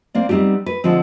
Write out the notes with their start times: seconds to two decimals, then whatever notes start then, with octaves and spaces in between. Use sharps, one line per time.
0.14 A#3 C4 D5
0.29 G3 B3 C4 D#4 G4
0.66 B4
0.84 D3 F3 G#3 C4